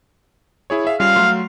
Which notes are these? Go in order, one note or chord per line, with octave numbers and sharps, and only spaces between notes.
E4 G#4 C#5
G#4 E5 F5
G3 C#4 F4 F5
F#3 A3 C6